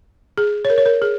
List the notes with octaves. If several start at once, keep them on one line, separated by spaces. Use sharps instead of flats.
G#4
C#5
A#4
C#5
A#4
G#4